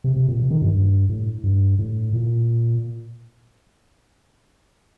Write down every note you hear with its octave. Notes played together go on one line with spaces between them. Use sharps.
C3
C3
A#2
C3
D#3
G2
G2
A2
G2
A2
A#2